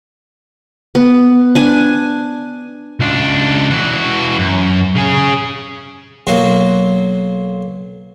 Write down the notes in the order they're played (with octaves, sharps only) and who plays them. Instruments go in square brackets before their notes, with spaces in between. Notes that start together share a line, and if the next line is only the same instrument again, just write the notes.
[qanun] B3
D4 G#5
[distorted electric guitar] C#2 D4
E3 F#4
F#2
C#3 G#4
[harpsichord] B1 F#3 A#3 F4 F#4